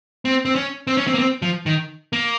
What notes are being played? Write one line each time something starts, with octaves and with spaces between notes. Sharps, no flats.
C4
C4
C#4
C4
C#4
C4
A#3
C4
F3
D#3
A#3